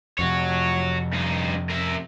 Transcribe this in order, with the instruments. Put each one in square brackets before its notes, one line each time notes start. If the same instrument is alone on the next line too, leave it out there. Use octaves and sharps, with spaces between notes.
[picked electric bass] F2 C3 [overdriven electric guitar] F#4 C#5
[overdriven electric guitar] G2 D#4
A#4 E5